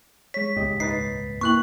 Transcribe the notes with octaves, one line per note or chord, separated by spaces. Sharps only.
G#3 C#5 B6
D#1 C#2 G#2 G4 D#5
D#4 B4 A6 C7
A#3 E4 G5 C#6 F#6 F#7